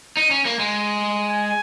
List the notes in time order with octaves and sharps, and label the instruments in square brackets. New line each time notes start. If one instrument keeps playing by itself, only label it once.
[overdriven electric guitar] D#4
C#4
A#3
G#3
[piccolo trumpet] G#5